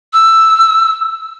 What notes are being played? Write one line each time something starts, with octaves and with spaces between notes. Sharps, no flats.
E6